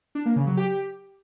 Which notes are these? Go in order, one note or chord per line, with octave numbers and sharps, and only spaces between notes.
D4
A#3
C#3
F#3
G4